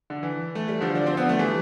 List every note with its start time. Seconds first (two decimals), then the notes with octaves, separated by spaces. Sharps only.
0.10 D3
0.23 E3
0.55 A3
0.68 G3
0.81 D3 F3
0.95 D4
1.06 C4
1.17 B3
1.29 A3
1.39 E3 G3